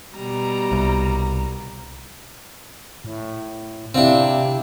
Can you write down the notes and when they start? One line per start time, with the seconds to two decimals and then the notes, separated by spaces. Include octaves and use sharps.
0.16 B2 G3 A#5
0.72 C2
3.05 A2
3.95 C3 C4 D4 E4 E5 F5